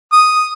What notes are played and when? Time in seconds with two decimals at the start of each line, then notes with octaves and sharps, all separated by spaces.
0.12 D#6